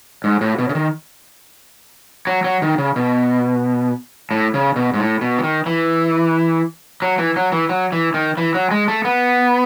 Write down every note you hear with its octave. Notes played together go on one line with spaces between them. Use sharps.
G#2
A2
B2
C#3
D#3
F#3
F#3
D#3
C#3
B2
A2
C#3
B2
G#2
A2
B2
E3
D#3
E3
F#3
E3
F#3
E3
F#3
E3
D#3
E3
F#3
G#3
A3
B3